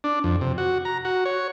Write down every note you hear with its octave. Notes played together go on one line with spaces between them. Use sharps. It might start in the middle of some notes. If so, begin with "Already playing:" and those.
D4
F2
C3
F#4
A#5
F#4
C#5